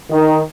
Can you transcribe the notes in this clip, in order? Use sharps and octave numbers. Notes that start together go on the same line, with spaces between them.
D#3